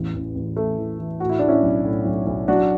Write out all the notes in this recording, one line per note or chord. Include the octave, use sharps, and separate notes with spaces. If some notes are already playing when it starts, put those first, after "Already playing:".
Already playing: A1 E2
A1
A1
A1 A3
E3
E3
A2 F#4
E4
A2 D4
C#4 E4
B1
A2
B1
B1
F#3 D4 F#4